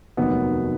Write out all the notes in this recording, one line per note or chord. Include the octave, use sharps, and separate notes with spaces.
F1 D#2 D#3 F#3 B3